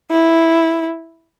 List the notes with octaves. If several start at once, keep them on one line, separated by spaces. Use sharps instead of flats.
E4